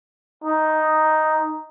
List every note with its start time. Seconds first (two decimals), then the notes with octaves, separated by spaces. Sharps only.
0.44 D#4